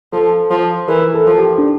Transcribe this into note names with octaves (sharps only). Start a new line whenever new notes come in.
F3 A4
F3
E3 A#4
A4
F3
G4
D4